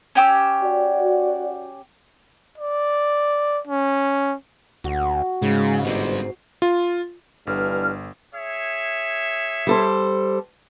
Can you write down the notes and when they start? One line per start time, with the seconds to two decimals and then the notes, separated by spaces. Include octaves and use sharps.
0.15 C#4 G4 E6
0.63 F#4 D5
2.58 D5
3.68 C#4
4.84 D2 F#4
5.42 G#2 C#3 G#3
5.84 G1 G3 C4
6.62 F4
7.47 G1 G2 D3 E3 F6
8.35 G#4 C#5 E5
9.67 G3 A4 C5